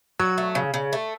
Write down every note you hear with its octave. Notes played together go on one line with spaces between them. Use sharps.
F#3 F#4
A3
C#3
C#3
A3